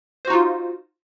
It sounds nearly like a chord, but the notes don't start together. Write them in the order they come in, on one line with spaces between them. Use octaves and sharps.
C5 F#4 D#4 F4